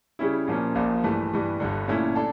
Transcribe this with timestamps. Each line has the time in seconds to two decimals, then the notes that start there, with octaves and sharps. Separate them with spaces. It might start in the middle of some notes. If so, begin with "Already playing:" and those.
0.19 C#3 G3 C#4 E4
0.48 A#2 F3 A#3 C#4
0.75 A#1 A#2 F3 A#3
1.04 G2 E3 A3
1.32 G2 E3 G3
1.60 G1 G2 D3
1.88 A#2 A3 C#4 E4
2.16 D4 A4